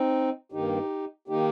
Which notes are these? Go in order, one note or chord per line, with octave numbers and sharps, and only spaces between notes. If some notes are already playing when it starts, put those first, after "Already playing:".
Already playing: C4 D#4
G2 D#3 A#3 D#4 G4
D#3 A#3 D#4 G4